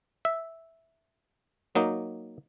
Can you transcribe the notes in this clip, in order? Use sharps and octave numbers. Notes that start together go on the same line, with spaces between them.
E5
F#3 A#3 D#4